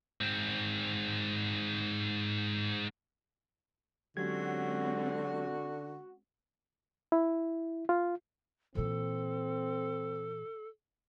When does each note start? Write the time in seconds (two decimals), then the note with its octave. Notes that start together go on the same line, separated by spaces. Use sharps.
0.21 G#2 C4
4.17 D3 F#3 G#3 C4 C#4 F#4 G4 G#6
7.12 E4
7.89 F4
8.75 A#2 E3 C4 A4